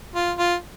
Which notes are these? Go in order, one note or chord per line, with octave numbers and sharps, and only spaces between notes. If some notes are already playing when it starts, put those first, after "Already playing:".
F4
F4